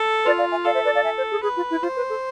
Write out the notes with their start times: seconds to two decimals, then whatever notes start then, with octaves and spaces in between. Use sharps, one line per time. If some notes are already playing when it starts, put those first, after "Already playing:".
Already playing: A4
0.25 F4 B4 D5
0.38 D5 F5
0.51 E5 G#5
0.64 A4 D5 F5
0.74 C5 E5
0.84 B4 D5
0.94 D5 F5
1.03 E5 G#5
1.16 C5
1.30 G#4
1.43 G#4 B4
1.56 F4
1.69 E4
1.82 F4 C5
1.96 B4
2.08 A4